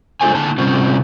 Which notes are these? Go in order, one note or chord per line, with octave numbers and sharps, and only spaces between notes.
G#3 D4 F4 A4 C5 G#5
D3 A#3 E4 A5
C3 G3 C4 C#4 F4